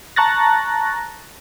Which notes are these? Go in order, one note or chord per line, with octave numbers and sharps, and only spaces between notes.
A5 A#5 C#6 F#6 A6 A#6